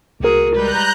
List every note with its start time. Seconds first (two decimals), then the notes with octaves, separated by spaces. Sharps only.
0.20 C2 A#3 F#4 G#4 A#4
0.55 G3 G#3 B4 A#5 F#6 G6